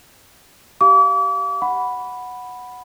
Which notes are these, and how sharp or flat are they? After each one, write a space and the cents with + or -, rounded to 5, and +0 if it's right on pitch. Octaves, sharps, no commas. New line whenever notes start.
G4 -10 F5 +0 D6 -40
F#5 -5 B5 +0